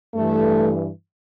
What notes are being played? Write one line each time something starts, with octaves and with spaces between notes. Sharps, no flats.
G2 E3 A3